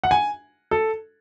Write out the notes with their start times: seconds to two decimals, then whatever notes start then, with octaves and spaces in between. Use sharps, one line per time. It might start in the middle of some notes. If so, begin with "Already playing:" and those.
0.04 F#5
0.11 G#5
0.71 A4